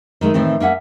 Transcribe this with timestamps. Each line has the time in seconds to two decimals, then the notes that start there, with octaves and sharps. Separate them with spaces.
0.21 D#3 G#3 A3
0.34 A2 D#3 E3 C4
0.60 A#3 C#4 E5 F#5